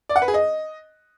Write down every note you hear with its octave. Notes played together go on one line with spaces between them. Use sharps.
D5
F#5
B4
G#4
D#5